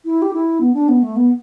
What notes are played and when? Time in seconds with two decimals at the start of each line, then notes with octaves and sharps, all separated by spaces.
0.05 E4
0.22 G4
0.34 E4
0.61 B3
0.74 D4
0.88 B3
1.03 A3
1.16 B3